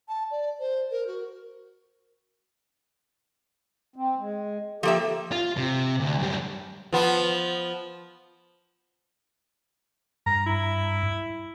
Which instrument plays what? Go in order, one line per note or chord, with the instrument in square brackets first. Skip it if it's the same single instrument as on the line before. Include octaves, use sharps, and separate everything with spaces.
[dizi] A5
D5
C5
A#4
F#4
[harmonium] C4
G#3
[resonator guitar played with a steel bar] F3 A#3 E5 [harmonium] G4 A4
[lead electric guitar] F4
C3
D2
F#2 G3
[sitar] F3 B3
[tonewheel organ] G2 [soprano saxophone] A#5
[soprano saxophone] E4